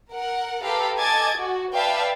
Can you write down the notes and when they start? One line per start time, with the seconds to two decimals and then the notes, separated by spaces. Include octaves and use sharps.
0.11 A#4 F#5
0.62 G4 A4 B4 F5 A#5
0.98 A4 D#5 G#5 D6 G#6 A6
1.36 F#4
1.73 B4 D5 E5 F5 G5 A5